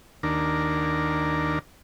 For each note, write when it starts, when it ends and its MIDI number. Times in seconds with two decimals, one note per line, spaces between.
0.23 1.59 39
0.23 1.59 62
0.23 1.59 70